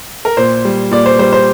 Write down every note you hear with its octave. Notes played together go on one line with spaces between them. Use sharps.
A#4
A#2 C5
G3
A#2 D5
C5
G3 C5
C5